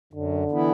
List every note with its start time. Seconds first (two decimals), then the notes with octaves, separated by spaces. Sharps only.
0.13 F#2 D3
0.51 E3 B3 E4